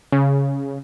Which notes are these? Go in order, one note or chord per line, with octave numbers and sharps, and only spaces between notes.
C#3